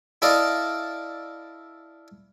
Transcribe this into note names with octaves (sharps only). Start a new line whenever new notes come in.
E4 A4 D5 D#5 F5